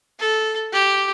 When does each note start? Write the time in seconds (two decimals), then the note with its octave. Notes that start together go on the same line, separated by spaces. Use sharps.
0.20 A4
0.73 G4